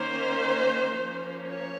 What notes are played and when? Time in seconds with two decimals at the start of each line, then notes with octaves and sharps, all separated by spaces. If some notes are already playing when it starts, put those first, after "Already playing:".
Already playing: D#3 A#3 C#4 C5
0.92 F3 A#3 C#4
1.48 C#5